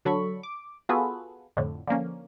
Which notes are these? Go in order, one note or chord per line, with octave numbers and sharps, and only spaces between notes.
D3 F#3 A4 B5 C#6
D6
B3 F4 F#4 G#4 A4 B4
F2 A2 D3
D3 F3 A#3 C#4